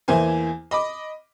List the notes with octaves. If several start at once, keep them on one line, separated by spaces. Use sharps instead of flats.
E2 E3 A#3 E4 C5 G#5
D#5 B5 D6